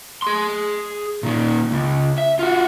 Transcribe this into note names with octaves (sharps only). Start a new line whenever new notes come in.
G#4 C6
A#2 D#3
C#2
E5
F4 F#4